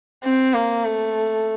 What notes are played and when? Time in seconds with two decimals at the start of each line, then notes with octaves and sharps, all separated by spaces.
0.24 C4
0.54 A#3
0.85 A3